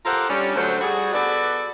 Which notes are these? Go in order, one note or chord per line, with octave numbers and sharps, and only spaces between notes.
F4 G4 A4 A#4 C5 F#5
G3 C#4 D4
D2 F#3 C5
G3 F#4 G#4
B3 F#4 A4 B4 D5